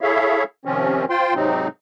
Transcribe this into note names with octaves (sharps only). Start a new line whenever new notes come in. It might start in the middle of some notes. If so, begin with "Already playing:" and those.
E4 G#4 A4 C#5 E5 F5
C3 D#3 F3 C4 C#4
F4 C5 G5 C6
G#2 C3 F#3 C4 D#4